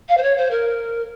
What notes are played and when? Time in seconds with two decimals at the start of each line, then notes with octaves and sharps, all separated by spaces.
0.09 F5
0.17 C5
0.23 C#5
0.37 C5
0.51 A#4